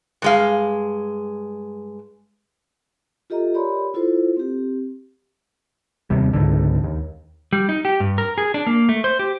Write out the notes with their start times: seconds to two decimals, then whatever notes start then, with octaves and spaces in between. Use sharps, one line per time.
0.22 G2 G#3 F5
3.30 F4 G4 A4 D#5 E5 A#5
3.54 G4 A#4 C#5 D5 B5 C6
3.94 E4 F4 A4 C5
4.37 C4 G4
6.10 D#2 C3 G3
6.33 C#2 G#2 D3
6.84 D#2
7.53 G3
7.69 D#4
7.85 G4
8.00 G2
8.18 A#4
8.38 G#4
8.54 D4
8.67 A#3
8.89 A3
9.04 C5
9.19 G4